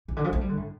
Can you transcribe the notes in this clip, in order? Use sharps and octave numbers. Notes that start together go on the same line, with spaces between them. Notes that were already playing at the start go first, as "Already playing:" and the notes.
C3
D3
F3
A3
G3
D3
A2